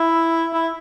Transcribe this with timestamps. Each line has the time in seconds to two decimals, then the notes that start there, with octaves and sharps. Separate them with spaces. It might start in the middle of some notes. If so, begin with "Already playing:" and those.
Already playing: E4
0.54 E4